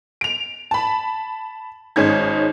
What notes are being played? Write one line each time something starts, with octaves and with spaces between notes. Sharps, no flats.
D7 F7
A5 B5
G#1 G#3 C#4 D#4 G#6